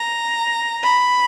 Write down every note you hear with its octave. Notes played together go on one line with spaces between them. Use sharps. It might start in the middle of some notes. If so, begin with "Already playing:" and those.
Already playing: A#5
B5